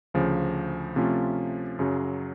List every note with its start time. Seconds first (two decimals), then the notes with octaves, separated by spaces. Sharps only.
0.14 D2 C#3 F3
0.96 C3 F3 A3 C#4 F4
1.79 F#2 C#3 F#3